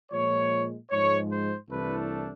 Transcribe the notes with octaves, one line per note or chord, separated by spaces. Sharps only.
A#2 F3 G#3 C#5
G#2 F3 G#3 C#5
C5
C2 C3 E3 A3 D4 B4